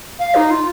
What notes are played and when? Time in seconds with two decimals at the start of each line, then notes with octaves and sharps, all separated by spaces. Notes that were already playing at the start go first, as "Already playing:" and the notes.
0.19 F5
0.35 D#4
0.50 F4